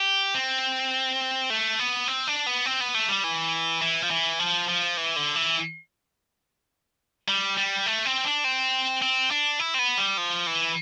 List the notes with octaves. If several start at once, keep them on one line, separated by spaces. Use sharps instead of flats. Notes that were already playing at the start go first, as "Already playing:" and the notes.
Already playing: G4
C4
A3
B3
C4
D4
B3
C4
B3
A3
G3
E3
E3
F3
E3
F3
F3
E3
D3
E3
G3
G3
A3
C4
D4
C4
C4
D4
E4
C4
B3
G3
F3
E3